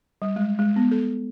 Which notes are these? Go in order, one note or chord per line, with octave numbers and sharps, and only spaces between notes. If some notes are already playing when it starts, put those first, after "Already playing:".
G3
G#3
G#3
B3
A4